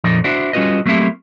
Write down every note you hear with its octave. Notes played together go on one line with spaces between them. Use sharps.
F2 A#2 F3 D#4 D5
D4 E4 F#4 C5 D5
G3 C#4 F4 F#4 B4 D#5
F#3 A3 A#3 C4 E4 G4